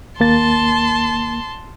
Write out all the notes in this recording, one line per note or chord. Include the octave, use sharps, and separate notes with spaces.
D#2 A#3 A5 C6 A6